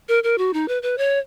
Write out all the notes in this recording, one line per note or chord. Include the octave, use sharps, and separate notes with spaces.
A#4
A#4
F#4
D#4
B4
B4
C#5